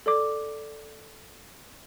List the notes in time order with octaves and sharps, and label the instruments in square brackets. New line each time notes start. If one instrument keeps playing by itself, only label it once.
[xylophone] A4 D5 D6